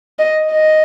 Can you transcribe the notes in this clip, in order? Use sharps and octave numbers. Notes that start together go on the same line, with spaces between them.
D#5
D#5